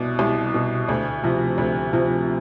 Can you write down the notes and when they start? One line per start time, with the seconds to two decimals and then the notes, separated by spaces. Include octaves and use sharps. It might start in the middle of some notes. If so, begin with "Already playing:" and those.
Already playing: C2 B2 D5
0.19 C2
0.54 B2
0.88 D2
1.23 C3 F3
1.58 D2
1.93 C3 F3